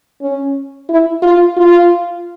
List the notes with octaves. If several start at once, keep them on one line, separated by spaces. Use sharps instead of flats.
C#4
E4
F4
F4